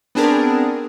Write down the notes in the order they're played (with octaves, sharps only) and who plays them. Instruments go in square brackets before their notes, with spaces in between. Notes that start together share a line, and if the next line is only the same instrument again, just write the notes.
[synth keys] B3 C4 D4 G#4 A#4